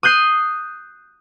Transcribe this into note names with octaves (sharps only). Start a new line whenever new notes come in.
D#6 F#6 G6 C7